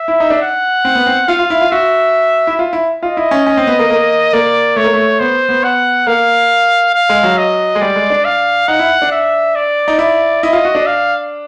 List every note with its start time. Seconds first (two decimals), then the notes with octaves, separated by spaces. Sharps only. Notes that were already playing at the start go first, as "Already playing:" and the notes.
Already playing: E5
0.08 E4
0.20 D#4
0.30 D4
0.41 F#5
0.85 C4
0.95 B3
1.07 C4
1.28 F4 F5
1.39 F4
1.50 E4
1.61 F4
1.72 F#4 E5
2.47 E4
2.59 F4
2.73 E4
3.03 F4 D#5
3.17 E4
3.31 C#4
3.46 C#4
3.57 C4
3.67 B3
3.79 A#3
3.90 A#3
4.33 A#3 D5
4.76 A3 C#5
4.84 A#3
4.93 A3
5.20 B3 C5
5.49 B3
5.64 F#5
6.07 A#3 F5
6.94 F5
7.09 G#3
7.23 F#3
7.38 D#5
7.75 G#3
7.81 G3 D5
7.96 G#3
8.10 D4
8.25 F5
8.68 D#4 F#5
8.79 E4
9.02 D4
9.12 E5
9.56 D5
9.88 D#4
9.99 E4 D5
10.43 E4 D#5
10.53 F4
10.65 F#4
10.75 D4
10.87 F5